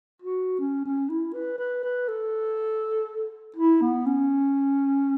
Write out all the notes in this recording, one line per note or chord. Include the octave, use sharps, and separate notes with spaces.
F#4
C#4
C#4
E4
B4
B4
B4
A4
E4
B3
C#4